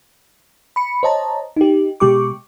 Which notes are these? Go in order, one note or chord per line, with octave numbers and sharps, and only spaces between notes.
B5 C#7
C5 C#5 D#5 A5 A#5
D#4 G4
B2 G#3 G4 C#6 D6